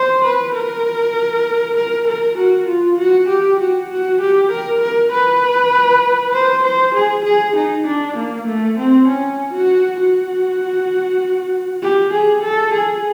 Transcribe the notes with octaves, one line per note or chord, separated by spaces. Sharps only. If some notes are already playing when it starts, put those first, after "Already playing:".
Already playing: C5
B4
A#4
A#4
A#4
F#4
F4
F#4
G4
F#4
F#4
G4
A#4
A#4
B4
C5
C5
G#4
G#4
D#4
D4
A#3
A3
C4
C#4
F#4
F#4
G4
G#4
A4
G#4